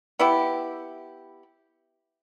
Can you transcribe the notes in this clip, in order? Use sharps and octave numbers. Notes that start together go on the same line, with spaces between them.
B3 E4 G4